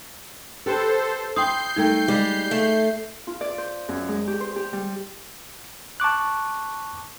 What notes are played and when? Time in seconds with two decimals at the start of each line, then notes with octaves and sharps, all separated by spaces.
0.66 G4 A4 B4 C5
1.36 E4 G5 C6 D#6 G6 C7
1.76 G3 A3 D#4 A#4 G5
2.08 G3 G#3
2.51 A3
3.27 F4
3.41 D5
3.58 C5
3.89 F#2
4.08 G#3
4.27 G4
4.40 C5
4.56 G4
4.73 G3
6.00 A5 C#6 D6 F#6